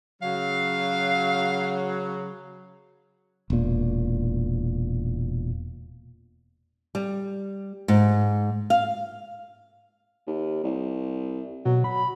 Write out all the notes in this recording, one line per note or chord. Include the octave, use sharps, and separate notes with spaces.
C#3 F#3 F5
E1 A#2
G3
G#2
F5
D#2
C2
B2 F#3
B5